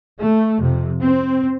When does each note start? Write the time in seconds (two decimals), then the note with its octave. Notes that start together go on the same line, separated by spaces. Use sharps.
0.19 A3
0.59 F2 C3
1.00 C4